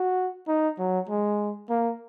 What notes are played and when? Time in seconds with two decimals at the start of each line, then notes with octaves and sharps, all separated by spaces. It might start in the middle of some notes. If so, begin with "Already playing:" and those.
Already playing: F#4
0.48 D#4
0.79 F#3
1.09 G#3
1.70 A#3